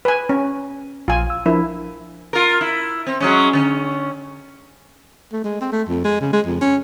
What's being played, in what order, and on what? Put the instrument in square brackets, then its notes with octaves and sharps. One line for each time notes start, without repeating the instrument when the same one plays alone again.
[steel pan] B4 G#5
C#4
[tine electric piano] A#1 [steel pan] F4 G#5
[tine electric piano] E6
[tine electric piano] F3 D4 A#4 [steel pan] E4
[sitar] F4 A#4
E4
C4
F#3 G#3 C#4
D3 C#4
[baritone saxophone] A3
G#3
C4
A3
F2
G#3
C#3
G#3
F2
C#4